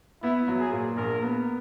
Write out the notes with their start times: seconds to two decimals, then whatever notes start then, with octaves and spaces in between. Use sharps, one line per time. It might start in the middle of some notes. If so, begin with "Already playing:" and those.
0.22 B3 E4
0.48 F#3
0.60 G#4
0.72 A#2
0.96 A#1 A#4
1.22 B3